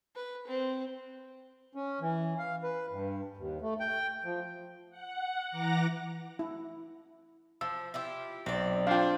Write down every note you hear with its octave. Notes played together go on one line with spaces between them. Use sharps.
B4
C4
C#4
E3
F5
B4
G2
D#2
A3
G5
F3
F#5
E3 F#5 A#5 D6 A#6
E4
F3 E6
E4 F4 G4
B1 C4 D5
D4 F4 C5 F5 G5